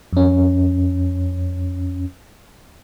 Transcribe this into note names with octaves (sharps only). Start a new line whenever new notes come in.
F2 C#4